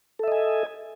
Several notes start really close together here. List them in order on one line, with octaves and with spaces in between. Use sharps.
A4 E5 D#5 G#5